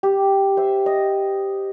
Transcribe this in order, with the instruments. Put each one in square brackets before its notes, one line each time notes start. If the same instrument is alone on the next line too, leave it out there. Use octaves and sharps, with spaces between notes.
[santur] G4
C5 E5
D#5